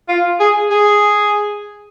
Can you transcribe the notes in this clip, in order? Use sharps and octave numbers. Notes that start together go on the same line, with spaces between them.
F4
G#4
G#4